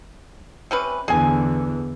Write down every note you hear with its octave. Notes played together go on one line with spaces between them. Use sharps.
C3 C#4 B4
E2 D3 G#4 G#5